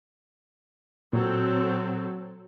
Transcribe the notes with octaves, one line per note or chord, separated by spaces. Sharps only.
A#2 F#3 C4 A4